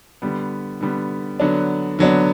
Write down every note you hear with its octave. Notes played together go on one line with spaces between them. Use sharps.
D3 G3 B3
D3 G3 B3
D3 F#3 B3 D4
D3 F#3 B3 D4